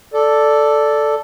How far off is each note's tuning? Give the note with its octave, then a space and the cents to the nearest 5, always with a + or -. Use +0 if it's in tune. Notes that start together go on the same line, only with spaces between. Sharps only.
A4 +0 D5 +0